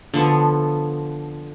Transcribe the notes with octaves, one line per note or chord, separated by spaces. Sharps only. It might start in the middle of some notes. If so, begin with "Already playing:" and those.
D3 F3 B3 A4